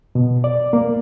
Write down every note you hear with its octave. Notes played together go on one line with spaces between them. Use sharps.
B2
D5
A#3